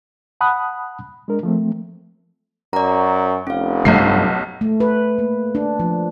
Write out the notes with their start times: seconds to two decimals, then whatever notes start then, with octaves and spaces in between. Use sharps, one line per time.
0.41 F#5 A5 B5 D#6 F#6
1.28 G#3 D4 A#4
1.43 F3 A3 C4
2.73 F#2 D5 A#5
3.47 F1 C#4 F5
3.85 B1 G2 C3 A3 C7
4.61 A3
4.80 B4
5.18 A#3
5.55 D4
5.80 F3